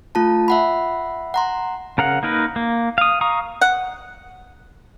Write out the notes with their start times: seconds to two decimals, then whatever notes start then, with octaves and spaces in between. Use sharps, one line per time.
0.15 A3 F4 A5
0.48 E5 F#5 B5
1.34 F#5 A#5 C6
1.98 C#3 A#4 F5 F#5
2.23 A#3 D#4 A#4 B4
2.56 A#3
2.98 F5 D#6
3.21 F5 A#5 C#6 D#6
3.61 F#5